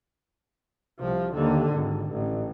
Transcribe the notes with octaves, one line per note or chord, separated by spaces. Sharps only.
C2 F3
D#2 D3
G#1
A1